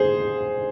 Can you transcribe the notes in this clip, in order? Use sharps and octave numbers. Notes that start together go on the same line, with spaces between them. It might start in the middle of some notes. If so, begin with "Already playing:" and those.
Already playing: G#4 C5